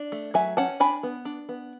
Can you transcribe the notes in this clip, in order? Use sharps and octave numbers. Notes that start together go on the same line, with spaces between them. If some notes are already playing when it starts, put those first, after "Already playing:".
Already playing: D4
A3
F#3 E5 G#5
C#4 F#5 A5
D4 G#5 B5
B3
D4
B3